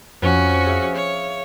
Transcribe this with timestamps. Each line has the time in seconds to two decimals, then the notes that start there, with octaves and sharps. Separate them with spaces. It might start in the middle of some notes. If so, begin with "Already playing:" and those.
0.22 F2 C#4 F#4
0.66 G#4 E5 F5
0.95 C#5